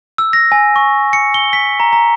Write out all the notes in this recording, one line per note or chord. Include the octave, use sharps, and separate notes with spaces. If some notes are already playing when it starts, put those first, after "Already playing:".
E6
A#6
G#5
C#6
C#7
G7
B6
A#5
A#5